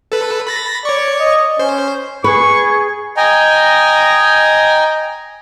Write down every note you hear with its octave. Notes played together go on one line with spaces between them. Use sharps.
A4 B4
B5 A6 A#6
C#5 D5 C#6
D#5
C#4 C5
G#4 B4 C#6
D#5 G5 G#5 A#5